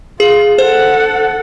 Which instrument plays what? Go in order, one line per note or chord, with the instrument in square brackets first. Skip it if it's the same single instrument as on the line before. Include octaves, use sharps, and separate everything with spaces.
[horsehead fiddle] F4 [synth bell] G#4
[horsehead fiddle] A4 F#5 [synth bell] C5